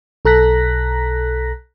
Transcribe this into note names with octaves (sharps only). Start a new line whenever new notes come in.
B1 A4 A#5 F#6 A#6 B6